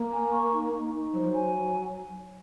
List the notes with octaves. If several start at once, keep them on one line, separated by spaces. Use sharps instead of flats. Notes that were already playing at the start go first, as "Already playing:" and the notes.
Already playing: A#3
G#5
C#6
D#4
D#4
D#4
F#3 C5
F3
F#3
G#5